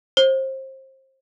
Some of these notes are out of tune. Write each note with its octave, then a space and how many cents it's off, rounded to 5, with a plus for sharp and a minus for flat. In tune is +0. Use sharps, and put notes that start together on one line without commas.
C5 +30